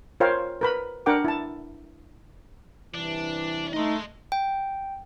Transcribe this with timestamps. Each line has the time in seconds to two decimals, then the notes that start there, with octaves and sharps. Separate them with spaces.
0.20 F4 A#4 C5 C#5 F5 G5
0.61 A#4 B4 B5
1.06 D4 A#4 F#5 G5 D6
1.25 E4 A5
2.94 G2 C3 E3 D4
3.74 A3 D#4 D#5 C6
4.32 G5